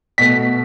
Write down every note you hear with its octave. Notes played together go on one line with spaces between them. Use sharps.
B2 A3 B6